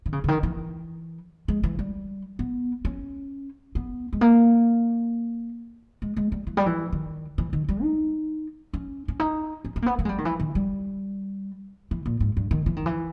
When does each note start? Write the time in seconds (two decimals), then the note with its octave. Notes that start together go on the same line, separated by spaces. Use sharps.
0.06 D#3
0.13 C#3
0.24 C#3
0.28 D#3
0.43 E3
1.48 G#3
1.63 E3
1.79 G3
2.39 B3
2.85 C#4
3.75 B3
4.13 G#3
4.21 A#3
6.02 G#3
6.16 G#3
6.32 G3
6.47 E3
6.57 G3
6.66 E3
6.92 D#3
7.38 E3
7.53 D#3
7.69 G3
7.83 D#4
8.73 C#4
9.08 C#4
9.20 D#4
9.65 C#4
9.76 C#4
9.82 A#3
9.86 B3
9.99 A#3
10.05 G#3
10.09 G3
10.18 D#3
10.25 E3
10.40 D#3
10.55 G3
11.91 E3
12.06 A#2
12.20 G#2
12.37 G2
12.51 D#3
12.66 E3
12.76 D#3
12.86 E3